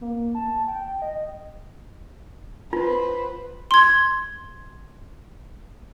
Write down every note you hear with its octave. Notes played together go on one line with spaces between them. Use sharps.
A#3
A5
G5
D#5
F4 B4 C5
C6 G#6